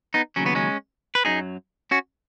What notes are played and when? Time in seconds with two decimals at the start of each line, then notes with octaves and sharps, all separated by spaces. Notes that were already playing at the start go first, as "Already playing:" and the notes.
0.14 B3 D#4
0.36 D#2 C#3 F#3 C#4
0.46 B3
0.55 G#3 C#4
1.15 B4
1.25 F#2 F#3 D#4 G#4
1.91 C#4 F#4